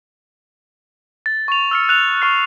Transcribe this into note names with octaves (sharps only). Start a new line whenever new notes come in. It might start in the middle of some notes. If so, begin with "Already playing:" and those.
A6
C#6 F7
E6 F6 C#7
F#6 F7
C#6 F6 F#6 C7